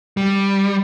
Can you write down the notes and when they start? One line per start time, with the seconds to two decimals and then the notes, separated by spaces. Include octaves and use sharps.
0.17 G3